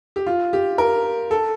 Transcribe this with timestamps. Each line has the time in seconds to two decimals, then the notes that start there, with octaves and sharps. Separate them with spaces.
0.16 G4
0.27 F4
0.53 G4
0.78 A#4
1.31 A4